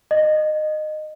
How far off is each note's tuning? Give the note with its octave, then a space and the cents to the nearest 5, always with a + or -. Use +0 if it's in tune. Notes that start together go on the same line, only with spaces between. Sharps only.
D#5 -20